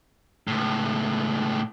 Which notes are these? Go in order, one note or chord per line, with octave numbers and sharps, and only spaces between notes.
C#2 A2